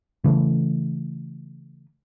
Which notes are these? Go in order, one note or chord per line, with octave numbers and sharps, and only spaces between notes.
C#3 E3 A3